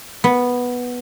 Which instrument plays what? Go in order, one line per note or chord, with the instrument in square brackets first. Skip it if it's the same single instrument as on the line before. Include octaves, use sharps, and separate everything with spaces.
[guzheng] B3